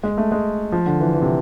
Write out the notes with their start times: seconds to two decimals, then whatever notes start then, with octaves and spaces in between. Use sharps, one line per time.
0.03 G#3
0.18 A3
0.32 G#3
0.72 F3
0.86 D3
1.00 E3
1.14 E3
1.22 C3